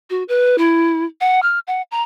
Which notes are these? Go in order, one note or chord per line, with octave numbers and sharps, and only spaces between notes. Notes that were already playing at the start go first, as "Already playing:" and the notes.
F#4
B4
E4
F#5
F6
F#5
A#5